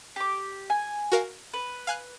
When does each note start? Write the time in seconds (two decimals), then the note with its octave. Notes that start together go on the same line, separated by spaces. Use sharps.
0.16 G4 D6
0.70 G#5
1.12 F#4 A#4 F5
1.54 B4
1.87 F5 G#5 F#6